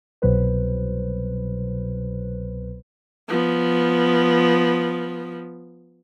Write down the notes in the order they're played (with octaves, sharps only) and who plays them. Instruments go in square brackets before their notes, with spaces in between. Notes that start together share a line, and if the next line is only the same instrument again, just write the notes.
[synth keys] C2 B2 F#3 B4 C5
[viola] F3 B3